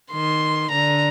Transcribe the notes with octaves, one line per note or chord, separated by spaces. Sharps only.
D#3 C6
D3 A#5